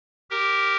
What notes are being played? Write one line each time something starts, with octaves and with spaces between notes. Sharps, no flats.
G4 A#4